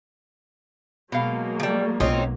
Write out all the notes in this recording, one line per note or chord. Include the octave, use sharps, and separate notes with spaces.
B2 F#3 G#3 A#3 F5
F3 G3
B1 C4 C#4 D#4 F4